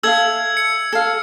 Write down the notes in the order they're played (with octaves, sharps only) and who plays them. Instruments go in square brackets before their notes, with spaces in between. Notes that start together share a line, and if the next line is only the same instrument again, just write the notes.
[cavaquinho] A4 E5 F5 [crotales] E6 G#6
[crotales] C#7
[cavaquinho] A4 F5